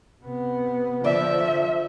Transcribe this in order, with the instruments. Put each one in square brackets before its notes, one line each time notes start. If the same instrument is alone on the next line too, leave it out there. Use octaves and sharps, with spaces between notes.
[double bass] C3 B3
[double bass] D3 F3 [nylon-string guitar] D5 [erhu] E5